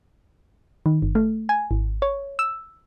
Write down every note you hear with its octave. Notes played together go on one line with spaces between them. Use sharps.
D#3
G1
A3
G#5
G#1
C#5
E6